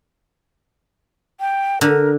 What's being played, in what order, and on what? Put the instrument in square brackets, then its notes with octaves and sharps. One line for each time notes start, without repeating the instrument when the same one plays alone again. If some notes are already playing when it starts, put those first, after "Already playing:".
[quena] G5
[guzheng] D3 [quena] A#4